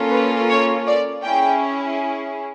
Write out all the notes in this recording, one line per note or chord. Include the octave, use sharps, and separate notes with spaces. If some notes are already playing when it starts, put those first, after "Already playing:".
Already playing: A#3 C#4 F4 A4
B4
C#5
D5
C#4 E4 G#4 G5